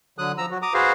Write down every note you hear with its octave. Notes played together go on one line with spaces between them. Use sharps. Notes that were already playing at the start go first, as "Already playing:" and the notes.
D3 F#3 D#6 F#6
F3 A#5 E6
F#3 F#4
A#5 D6 D#6
F#4 G#4 B4 C5 F5